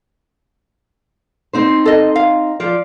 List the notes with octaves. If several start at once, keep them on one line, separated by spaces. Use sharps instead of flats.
C4 D#4 C5
A4 D#5
F5
F3 F4 D5